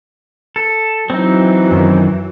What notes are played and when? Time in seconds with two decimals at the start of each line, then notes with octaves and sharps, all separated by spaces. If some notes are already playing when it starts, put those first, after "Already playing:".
0.56 A4
1.10 E3 F#3 C4 D#4
1.71 F#2 D#3